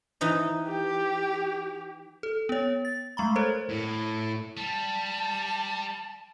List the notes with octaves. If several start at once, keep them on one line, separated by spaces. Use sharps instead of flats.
E3 D#4 D#5
G4
A4
B3 C#5
A6
G#3 A3 A#5 B5
A4 A#4 C5 C#5
A2
G3 A5